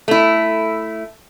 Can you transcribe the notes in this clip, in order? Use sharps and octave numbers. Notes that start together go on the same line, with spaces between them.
A3 E4